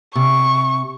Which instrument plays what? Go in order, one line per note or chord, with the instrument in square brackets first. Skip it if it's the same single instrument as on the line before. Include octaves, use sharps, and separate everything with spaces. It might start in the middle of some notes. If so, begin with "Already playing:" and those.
[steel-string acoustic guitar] C3 [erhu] C#6